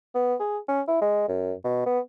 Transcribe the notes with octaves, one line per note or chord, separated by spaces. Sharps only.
B3
G#4
C#4
E4
G#3
F#2
B2
B3